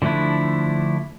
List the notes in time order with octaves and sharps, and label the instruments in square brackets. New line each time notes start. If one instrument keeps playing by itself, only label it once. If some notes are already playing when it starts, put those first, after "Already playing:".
[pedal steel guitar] D3 F3 A3 D4 E4